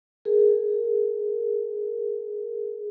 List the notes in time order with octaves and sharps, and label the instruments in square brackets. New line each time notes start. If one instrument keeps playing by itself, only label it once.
[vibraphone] G#4 A#4